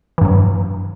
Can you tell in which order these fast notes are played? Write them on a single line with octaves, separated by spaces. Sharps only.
E3 G2 F#3